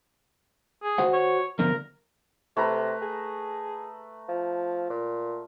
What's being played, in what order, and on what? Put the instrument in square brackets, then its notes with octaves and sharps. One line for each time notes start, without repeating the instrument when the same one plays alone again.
[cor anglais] G#4
[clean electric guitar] F#4 C5 F#5
[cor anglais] C#5
[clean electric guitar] D3 F3 B3 [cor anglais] A#4
[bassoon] C3 [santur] A3 B4 A#5
[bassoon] G#4
F3
A#2